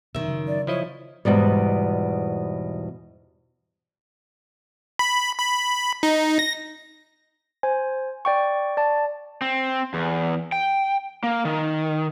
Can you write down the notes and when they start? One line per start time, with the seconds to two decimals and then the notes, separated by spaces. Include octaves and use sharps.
0.15 F#2 B2 D#3 E5
0.28 C#3 F#3
0.47 D5
0.67 F3 E4 C#5 D#5
1.25 E2 G#2 B2 G3
4.99 B5
5.38 B5
6.03 D#4
6.39 A#6
7.63 C5 G#5
8.25 D5 G5 C#6
8.77 D5 A5
9.41 C4
9.94 E2
10.52 G5
11.23 A#3
11.45 D#3